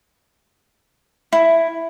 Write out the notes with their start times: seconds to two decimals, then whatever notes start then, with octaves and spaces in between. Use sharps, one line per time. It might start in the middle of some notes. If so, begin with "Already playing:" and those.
1.33 E4